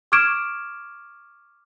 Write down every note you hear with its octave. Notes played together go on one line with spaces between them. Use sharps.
C#6 D6 F6 G#6 D7 E7